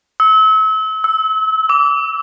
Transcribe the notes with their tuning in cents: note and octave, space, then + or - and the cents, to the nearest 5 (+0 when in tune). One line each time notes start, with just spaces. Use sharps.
E6 -35
E6 -10
D6 -30